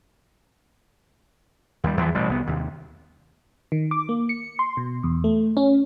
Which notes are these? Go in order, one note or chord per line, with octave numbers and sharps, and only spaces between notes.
D#2 G3
E2 E3 F3
A1 B2 G3
C2 B3
D#2 C3
D#3
D6
A#3
C#7
C6
B2
E2
A3
C#4